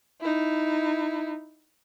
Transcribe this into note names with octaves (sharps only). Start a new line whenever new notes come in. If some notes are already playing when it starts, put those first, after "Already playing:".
D#4 E4